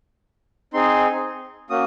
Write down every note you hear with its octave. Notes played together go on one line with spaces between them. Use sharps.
C4 D#4 G#4 C6
A#3 C#4 F#4 D#6